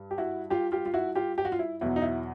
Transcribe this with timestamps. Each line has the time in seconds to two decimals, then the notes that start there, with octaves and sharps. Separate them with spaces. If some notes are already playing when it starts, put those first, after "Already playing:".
Already playing: G2
0.11 G4
0.18 E4 F#4
0.50 F4 G4
0.72 F4 G4
0.86 F4
0.94 E4 F#4
1.16 F4 G4
1.38 G4
1.45 F#4
1.52 F4
1.59 E4
1.81 E2 B2 F#3 E4
1.96 D#4
2.02 E4